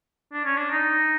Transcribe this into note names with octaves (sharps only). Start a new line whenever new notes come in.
D4
C#4
D4
D#4